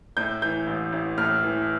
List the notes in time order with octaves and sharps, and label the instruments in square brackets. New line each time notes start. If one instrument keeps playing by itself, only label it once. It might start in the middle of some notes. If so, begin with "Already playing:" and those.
[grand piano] A2 G6
E3 G6
A1
A1
A2 F6
E3